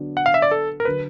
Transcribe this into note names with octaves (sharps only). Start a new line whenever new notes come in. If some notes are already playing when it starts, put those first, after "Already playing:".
Already playing: D3 F#3 B3 D4
F#5
F5
E5
D5
A4
A#4
D3 F#3 B4